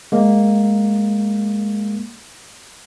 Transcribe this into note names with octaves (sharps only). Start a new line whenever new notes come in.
G#3 A#3